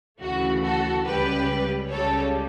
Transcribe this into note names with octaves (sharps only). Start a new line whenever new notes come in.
D2 C#3 E3 A3 F#4
F#4 A4
C#2 C#3 G3 G4 B4
C#2 C#3 G3 A4 C#5